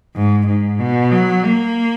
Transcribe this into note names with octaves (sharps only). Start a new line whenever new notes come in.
G#2
G#2
B2
F#3
A#3